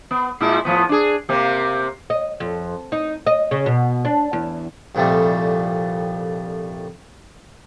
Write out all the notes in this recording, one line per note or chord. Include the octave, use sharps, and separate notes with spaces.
B3
A#2 G#3 E4
A2 F3 B3
D4 G#4
C3 A#3 C4
D#5
F2
D#4
D#5
C#3
B2
D4
E2
C2 F2 A#2 G3 A3